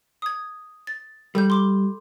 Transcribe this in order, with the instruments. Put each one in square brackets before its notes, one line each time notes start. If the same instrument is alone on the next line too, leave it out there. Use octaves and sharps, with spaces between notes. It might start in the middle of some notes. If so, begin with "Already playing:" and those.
[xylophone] D#6 G#6
A6
[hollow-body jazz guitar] G3 [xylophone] A4 G6
[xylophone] C6 D6 G7